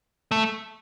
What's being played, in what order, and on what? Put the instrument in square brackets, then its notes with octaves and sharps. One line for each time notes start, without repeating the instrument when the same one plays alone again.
[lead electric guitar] A3